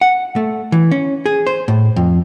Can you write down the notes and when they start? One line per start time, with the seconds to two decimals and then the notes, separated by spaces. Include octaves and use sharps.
0.01 F#5
0.36 A3
0.72 E3
0.91 C#4
1.26 G#4
1.47 C5
1.68 A2
1.96 F2